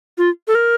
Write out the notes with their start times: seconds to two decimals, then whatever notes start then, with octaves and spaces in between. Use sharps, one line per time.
0.18 F4
0.48 A4
0.55 A#4